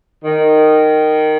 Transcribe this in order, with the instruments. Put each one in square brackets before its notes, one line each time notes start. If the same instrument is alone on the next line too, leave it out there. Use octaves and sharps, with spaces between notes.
[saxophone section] D#3